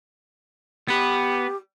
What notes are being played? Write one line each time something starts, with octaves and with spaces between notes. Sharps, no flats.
B3 G4 B4